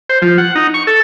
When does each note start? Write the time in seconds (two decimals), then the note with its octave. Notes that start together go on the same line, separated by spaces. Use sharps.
0.10 C5
0.22 F3
0.38 F#5
0.56 D#4
0.74 C#6
0.87 A4